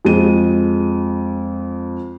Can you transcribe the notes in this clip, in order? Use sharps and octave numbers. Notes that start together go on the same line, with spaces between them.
F2 G#3 D#7